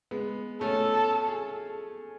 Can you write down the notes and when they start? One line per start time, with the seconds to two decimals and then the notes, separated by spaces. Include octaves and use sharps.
0.11 G#3 B3
0.61 A3 C#4 A4
1.28 G#4